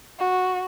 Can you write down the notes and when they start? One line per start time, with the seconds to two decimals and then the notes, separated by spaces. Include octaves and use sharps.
0.19 F#4